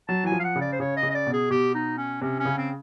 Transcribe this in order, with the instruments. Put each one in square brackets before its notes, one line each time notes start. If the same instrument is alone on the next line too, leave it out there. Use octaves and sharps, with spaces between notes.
[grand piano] F#3 [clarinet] A5
[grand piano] E3 [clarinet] G#5
[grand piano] F3
[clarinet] F5
F#5
[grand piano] C#3
[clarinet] D5
C5
[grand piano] C#3 [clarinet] C#5
[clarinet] D#5
[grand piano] C#3
[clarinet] D#5
D5
[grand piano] B2
[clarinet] G#4
[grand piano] B2 [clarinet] G4
[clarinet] D#4
C#4
[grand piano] C3 [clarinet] C#4
[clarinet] C#4
[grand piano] C#3
[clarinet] C4